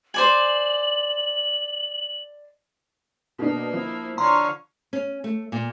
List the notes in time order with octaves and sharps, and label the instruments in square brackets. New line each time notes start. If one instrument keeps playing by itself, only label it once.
[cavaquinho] C5 D5 G#5 [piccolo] F#7
[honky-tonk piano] B2 D4 [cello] A#3
[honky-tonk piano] F3 [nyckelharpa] E4
[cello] D3 [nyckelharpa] C#5 F5 [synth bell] A#5 C6
[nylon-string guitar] C#4
A3
A#2